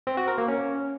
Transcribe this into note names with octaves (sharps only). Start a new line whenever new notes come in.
C4
F#4
A#4
A#3
C#4